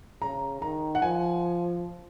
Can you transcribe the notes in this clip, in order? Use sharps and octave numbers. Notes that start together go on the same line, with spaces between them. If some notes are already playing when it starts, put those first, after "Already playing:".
C#3 A#5
D#3 A#5
F#5
F3 G#5